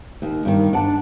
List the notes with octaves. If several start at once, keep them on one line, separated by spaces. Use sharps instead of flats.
D#2
G2 D#3
D4 F#5 A5